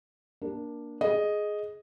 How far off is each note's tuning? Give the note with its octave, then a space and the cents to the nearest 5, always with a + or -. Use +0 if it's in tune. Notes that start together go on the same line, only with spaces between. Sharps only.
A#3 +15 D4 +0
G#4 +10 D#5 +0